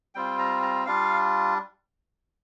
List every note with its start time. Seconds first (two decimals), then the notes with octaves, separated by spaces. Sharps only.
0.15 G3 C4 F4 G5
0.39 A#5
0.63 A#5
0.86 G3 D4 F4 F5